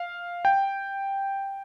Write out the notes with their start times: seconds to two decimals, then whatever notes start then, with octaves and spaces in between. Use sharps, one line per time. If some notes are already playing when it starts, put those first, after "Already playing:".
Already playing: F5
0.45 G5